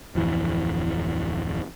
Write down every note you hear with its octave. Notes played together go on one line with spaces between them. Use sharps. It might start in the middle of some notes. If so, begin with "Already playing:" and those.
D1 F2 E3